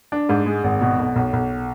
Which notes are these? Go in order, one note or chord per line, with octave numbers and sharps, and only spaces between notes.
D4
G#2
G#3
G#1
B2
B1
B1
B1